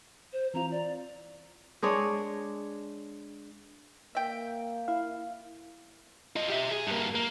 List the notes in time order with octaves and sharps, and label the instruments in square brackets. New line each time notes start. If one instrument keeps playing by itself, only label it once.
[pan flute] C5
[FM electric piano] E3 C4 F4 [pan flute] A#5
[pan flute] D5
[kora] G#3 D4 G#4 C#5
[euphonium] A#3 [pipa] E5 G5
[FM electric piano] E4 F5
[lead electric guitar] F4 D#5
G4 E5
G#4
G2 A#3
A#3